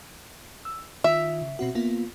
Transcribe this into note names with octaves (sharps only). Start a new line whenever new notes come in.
E6
D#3 F4 E5
C#3
B2 C4 F#4
A#3 B3 F4